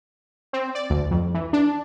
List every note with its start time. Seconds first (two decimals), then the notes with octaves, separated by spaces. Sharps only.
0.53 C4
0.75 D5
0.90 D2
1.11 F2
1.34 E3
1.53 D4